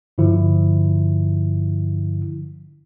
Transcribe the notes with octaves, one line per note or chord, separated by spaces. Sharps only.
G2 D3 F3 E4